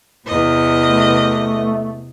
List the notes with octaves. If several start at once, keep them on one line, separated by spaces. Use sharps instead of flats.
E2 C3 D#5
A3